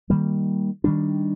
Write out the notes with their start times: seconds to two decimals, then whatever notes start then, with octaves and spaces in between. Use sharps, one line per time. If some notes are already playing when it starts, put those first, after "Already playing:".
0.10 D#3 G3 A#3
0.84 D#3 G3 D4